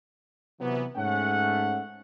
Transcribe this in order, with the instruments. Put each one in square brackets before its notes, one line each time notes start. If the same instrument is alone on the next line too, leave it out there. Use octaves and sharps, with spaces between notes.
[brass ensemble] C3 E3 F#3 B3
G#2 A3 C#4 F#5